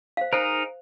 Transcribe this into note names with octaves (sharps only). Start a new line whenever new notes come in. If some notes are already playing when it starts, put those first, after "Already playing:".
C5 F5
D#4 G#4 A#4 C5